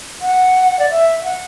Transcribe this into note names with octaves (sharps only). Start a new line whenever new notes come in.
F#5
D5
E5
F#5